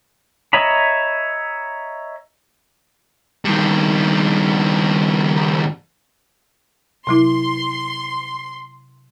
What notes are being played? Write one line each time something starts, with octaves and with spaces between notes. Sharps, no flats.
C#5 D#5 E5 A#5 B5
G2 D#3
C3 F#3 E4 C6